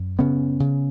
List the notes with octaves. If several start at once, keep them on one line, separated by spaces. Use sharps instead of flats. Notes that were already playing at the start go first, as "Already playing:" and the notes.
Already playing: F#2
C#3 B3 C#4
C#3